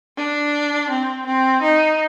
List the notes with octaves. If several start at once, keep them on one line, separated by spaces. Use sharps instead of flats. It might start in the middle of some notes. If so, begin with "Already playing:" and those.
D4
C4
C4
D#4